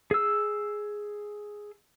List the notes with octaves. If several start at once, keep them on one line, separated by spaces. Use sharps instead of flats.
G#4 E6